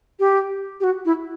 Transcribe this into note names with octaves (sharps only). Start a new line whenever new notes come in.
G4
G4
F#4
E4